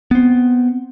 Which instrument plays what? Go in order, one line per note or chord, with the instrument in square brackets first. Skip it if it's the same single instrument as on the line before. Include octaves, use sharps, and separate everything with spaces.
[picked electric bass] B3 C4